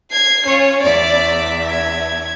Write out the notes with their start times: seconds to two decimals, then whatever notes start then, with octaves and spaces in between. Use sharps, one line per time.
0.11 G#6 C7
0.47 C#4 F4 C#5
0.83 E2 D5 E5
1.71 G#6